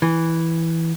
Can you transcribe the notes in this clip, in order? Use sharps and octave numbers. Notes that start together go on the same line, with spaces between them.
E3